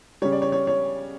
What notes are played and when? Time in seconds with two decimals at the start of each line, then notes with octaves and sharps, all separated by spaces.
0.22 C#3 G3 C#5
0.32 D5
0.42 C#5
0.52 C#5
0.67 C#5